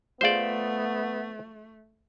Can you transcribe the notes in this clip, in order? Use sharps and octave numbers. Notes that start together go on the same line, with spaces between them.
A3 B3 F4 G#4 C5 D5 F5